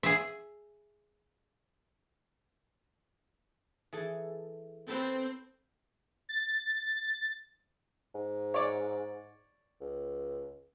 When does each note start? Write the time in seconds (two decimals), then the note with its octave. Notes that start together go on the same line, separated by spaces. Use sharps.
0.03 G#4 E5
3.93 E3 G#4 A4
4.88 C4 A4 B4 A5
6.29 A6
8.15 G#2
8.54 C#5 D5
9.81 C#2